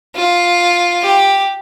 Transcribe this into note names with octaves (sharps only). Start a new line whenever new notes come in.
F4
G4